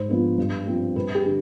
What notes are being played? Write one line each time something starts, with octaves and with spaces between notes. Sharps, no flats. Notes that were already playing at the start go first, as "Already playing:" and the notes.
Already playing: G#2 C5
F3 B3 D4
G2
F3 C4
G2 B4
G4
D3